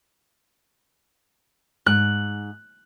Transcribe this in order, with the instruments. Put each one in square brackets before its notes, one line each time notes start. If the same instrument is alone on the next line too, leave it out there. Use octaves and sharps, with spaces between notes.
[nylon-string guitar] G#2 [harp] F#6